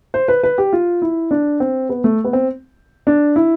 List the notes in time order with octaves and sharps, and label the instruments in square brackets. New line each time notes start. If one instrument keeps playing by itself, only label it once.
[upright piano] C5
B4
B4
G4
F4
E4
D4
C4
B3
A3
B3
C4
D4
E4